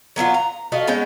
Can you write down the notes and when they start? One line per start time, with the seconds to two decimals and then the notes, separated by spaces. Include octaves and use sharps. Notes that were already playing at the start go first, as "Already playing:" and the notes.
0.16 F#3 B3 E4 F4
0.34 A#5
0.72 A3 F4 F#4 D#5
0.87 G#3 B3 C#4 G5